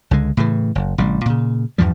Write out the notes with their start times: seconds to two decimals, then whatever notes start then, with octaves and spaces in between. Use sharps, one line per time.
0.11 C#2 D3 G#3
0.37 A2 C#3 E3
0.75 F#1
0.98 A1 C3 G3
1.26 A#2 C#3
1.78 E2 G2 F3 G3